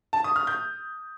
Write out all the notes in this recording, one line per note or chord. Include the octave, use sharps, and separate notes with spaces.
A5
D#6
F6
G6